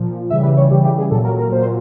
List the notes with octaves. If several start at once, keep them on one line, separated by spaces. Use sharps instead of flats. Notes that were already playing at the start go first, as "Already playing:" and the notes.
Already playing: A#2 F3
C#3 E3 G3 E5
B4
C#5
C#3 E3 G3 G4
G4
G#4
A#2 F#3 A4
A#4
A#4
A#2 F#3 C5